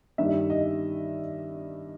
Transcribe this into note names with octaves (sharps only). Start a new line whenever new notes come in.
G2 D#3 G3 E5
D#5